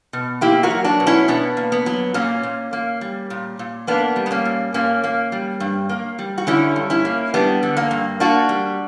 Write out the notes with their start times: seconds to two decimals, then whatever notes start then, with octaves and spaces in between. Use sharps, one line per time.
0.13 B2
0.41 A#3 E4 G4
0.63 F#4 A#4
0.70 F#3
0.84 D4 F#4
1.00 B2
1.07 C#4 E4
1.28 B2 B3 D4
1.57 A#3
1.72 B3
1.86 F#3
2.14 A#2 A#3 C#4
2.43 A#2
2.73 A#3
3.01 G3
3.30 A#2
3.59 A#2
3.87 A#3 B3 D4
4.16 G3
4.26 B3
4.31 A#3 C#4
4.45 A#2
4.74 A#2 A#3 C#4
5.04 A#3
5.32 G3
5.60 G2
5.89 A#3
6.19 G3
6.38 F#4
6.47 D3 C#4 E4
6.76 G2
6.90 C#4 E4
7.05 A#3
7.34 G3 B3 D4
7.63 D3
7.77 A#3
7.91 G2
8.20 A#3 D4 F#4
8.49 G3